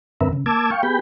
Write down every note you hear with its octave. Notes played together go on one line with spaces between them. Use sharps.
G2 D3 C4 A#4 B4 E5
C#3
A#3 A5 D6 E6 G#6
F5 G5 C#6
B3 G4 G#4 B5 G6